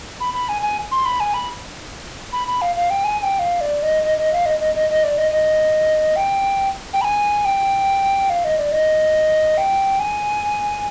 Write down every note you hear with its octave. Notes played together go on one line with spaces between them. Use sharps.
B5
B5
G#5
G#5
C6
B5
G#5
B5
B5
B5
F5
F5
G5
G#5
G#5
G5
F5
D5
D#5
D#5
D#5
F5
D#5
D#5
D#5
D#5
D5
D#5
D#5
G5
G5
B5
G#5
G5
F5
D#5
D5
D#5
G5
G#5